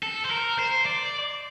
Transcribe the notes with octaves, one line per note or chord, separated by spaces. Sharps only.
A4
C5
A#4
C5
D5